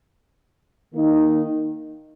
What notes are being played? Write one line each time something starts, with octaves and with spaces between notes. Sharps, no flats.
D#3 A#3 D#4